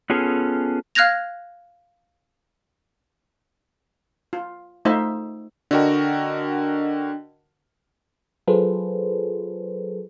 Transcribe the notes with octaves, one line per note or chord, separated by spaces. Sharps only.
B3 C#4 F4 G#4 A4
F5 F6 F#6 G#6 A#6 F7
F4
A3 D#4 F4 C5 E5
D3 D4 F#4 A#4 D#5 G5
F#3 F4 G#4 A4 B4 C5